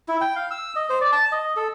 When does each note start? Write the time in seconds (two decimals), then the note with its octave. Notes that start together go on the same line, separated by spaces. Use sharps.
0.08 E4
0.21 G5
0.36 F5
0.51 E6
0.76 D#5
0.89 C5
1.01 D5
1.12 A5
1.32 D#5
1.56 A4